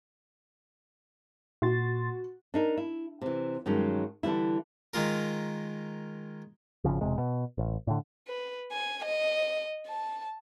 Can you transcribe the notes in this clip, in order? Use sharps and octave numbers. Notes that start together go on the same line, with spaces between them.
A#2 F#4 C6 A6
D4 D#4 A#4
E4
C3 E3
G2 D#3 F#3 G#3 C#4
D3 E3 G3 E4
D#3 G#3 F4 A#4
G#1 C#2 C#3 F3
E1 C3 G#3
B2
A1
A2 D3
B4
G#5
D#5
A5